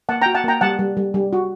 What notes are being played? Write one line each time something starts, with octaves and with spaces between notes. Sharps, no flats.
A#3 F#5 A5
G5 A#5
F#4
F#5 A5
A#3 G5 A#5
G3 F#5 A5
G3
G3
G3
F#4